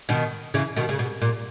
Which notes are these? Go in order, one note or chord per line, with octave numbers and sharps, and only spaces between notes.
B2 D#3
C#3 E3
B2 D#3
C#3
B2
A#2